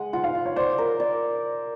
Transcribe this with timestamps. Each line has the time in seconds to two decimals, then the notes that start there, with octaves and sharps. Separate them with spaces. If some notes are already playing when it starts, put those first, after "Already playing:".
Already playing: G#3 F#5
0.13 F4 F#5
0.24 F5
0.35 F4
0.46 C#5
0.56 C5 D5
0.78 A#4
1.00 D5